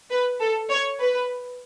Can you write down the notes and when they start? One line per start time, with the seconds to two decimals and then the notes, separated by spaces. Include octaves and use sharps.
0.11 B4
0.40 A4
0.69 C#5
0.99 B4